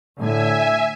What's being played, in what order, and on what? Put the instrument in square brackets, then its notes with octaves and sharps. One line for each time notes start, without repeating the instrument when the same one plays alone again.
[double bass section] A2 D3 [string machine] E5 G#5